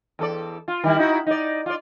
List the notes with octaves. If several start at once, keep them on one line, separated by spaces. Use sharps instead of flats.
E2 A4 D5
F4
D#3 G3 E4
D#4 E4 F#4
D#4 D5
F4 D5